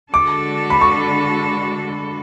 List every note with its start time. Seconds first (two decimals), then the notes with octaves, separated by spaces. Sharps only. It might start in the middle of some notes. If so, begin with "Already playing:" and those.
0.14 D3 G#3 D4 F#4 A4 D6
0.70 B5
0.81 C#6